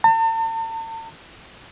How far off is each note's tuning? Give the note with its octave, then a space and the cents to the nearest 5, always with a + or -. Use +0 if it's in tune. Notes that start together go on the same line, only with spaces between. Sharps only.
A5 +45